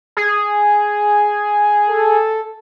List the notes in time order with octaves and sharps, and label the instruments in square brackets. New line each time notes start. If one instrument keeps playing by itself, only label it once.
[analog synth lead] G#4
[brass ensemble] A4